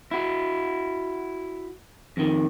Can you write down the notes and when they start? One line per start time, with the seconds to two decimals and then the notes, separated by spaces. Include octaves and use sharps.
0.11 E4 F#4
2.17 F2 D#3